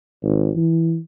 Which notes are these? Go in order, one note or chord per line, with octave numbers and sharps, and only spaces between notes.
G#1
E3